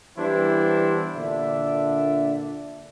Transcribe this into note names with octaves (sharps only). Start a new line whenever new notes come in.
E3 G3 B3 D4 E4 C5
A#2 D3 D4 D5 E5